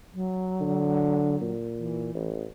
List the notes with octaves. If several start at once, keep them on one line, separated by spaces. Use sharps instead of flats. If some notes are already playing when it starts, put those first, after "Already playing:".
F#3
D3
A#2
E3
A1